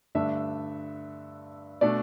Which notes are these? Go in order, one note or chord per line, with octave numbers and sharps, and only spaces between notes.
G2 D3 A3 D4 E5
B2 A3 D4 D5